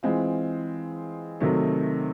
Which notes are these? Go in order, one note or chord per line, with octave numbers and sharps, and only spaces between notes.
E3 G#3 C4 F4
C3 D#3 F#3 A3